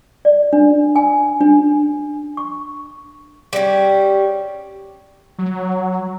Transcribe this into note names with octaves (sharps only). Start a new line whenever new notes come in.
D5
D4
G#5
D4
C#6
G3 C#4
F#3